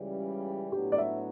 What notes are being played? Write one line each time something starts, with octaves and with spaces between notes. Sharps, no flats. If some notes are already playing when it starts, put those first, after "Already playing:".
Already playing: C#2 C#3 E3 G3
A2 F#3 B3 D4 G4
D5
E5